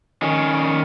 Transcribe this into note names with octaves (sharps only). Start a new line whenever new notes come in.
D#3 C#4